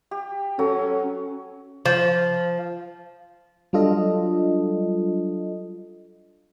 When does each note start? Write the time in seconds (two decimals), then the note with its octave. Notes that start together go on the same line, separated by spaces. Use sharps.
0.11 G4
0.59 F#3 C#4 A4
1.86 F3
3.73 F#3 G3 D4 F4 A4 D#5